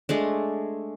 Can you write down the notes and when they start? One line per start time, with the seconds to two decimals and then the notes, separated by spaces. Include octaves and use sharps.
0.09 G#3 A3 D4